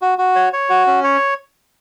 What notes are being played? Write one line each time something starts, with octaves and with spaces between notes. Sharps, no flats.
F#4
F#4
C#5
C#5
F#4
C#4
C#5